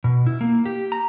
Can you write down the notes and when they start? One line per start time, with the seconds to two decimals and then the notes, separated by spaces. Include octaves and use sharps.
0.04 B2
0.27 E4
0.41 A#3
0.65 G4
0.92 A#5